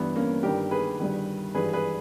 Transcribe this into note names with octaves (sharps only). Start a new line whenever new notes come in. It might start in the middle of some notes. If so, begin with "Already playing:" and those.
Already playing: G1 G2 E3 B3
A#3 C#4
G1 G2 D#3 G4 A#4
G#4 B4
G1 G2 D#3
G#1 G2 E3 G#4 B4
G#4 B4